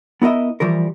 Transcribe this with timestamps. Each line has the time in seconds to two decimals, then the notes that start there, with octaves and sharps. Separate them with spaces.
0.22 B3 E4 A#4 D#5 E5
0.60 E3 F3 G3 A#4